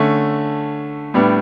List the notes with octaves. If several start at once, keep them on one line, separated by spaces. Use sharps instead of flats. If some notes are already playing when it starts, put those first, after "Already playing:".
Already playing: D3 A3 C#4
A2 G3 B3 D4